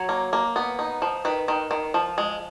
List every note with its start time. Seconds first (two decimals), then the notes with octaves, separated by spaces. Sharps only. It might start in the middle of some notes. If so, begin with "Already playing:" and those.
Already playing: F#3 C#5
0.09 A#3
0.33 A#3
0.56 B3
0.79 D#4
1.02 F3
1.25 D#3 B4
1.48 D#3
1.71 D#3
1.94 F3
2.18 G#3